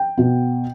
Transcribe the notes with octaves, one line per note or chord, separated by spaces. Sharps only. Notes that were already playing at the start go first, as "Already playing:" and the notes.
Already playing: G5
B2 B3